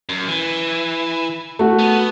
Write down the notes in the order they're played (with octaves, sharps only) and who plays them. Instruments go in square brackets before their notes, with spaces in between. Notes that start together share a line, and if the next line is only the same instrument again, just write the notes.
[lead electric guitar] F#2
E3
[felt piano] A3 F#4
[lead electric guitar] B3